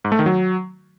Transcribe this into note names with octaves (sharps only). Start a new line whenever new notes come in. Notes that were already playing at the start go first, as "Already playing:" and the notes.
G#2
A3
D#3
F#3